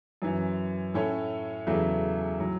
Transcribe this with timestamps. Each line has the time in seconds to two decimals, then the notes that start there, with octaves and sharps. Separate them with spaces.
0.22 F#2 E3 C#4
0.94 A2 A3 C#4 A4 C#5
1.66 E2 C#3 F#3 A3
2.39 A2 F#3